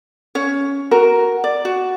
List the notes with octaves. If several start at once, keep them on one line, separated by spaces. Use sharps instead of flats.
C#4 C#5
F#4 A#4
D5
F#4